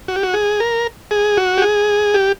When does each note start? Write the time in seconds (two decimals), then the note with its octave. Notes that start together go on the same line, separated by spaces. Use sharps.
0.08 F#4
0.16 G4
0.23 F#4
0.34 G#4
0.60 A#4
1.11 G#4
1.37 F#4
1.58 G4
1.62 G#4
2.14 G4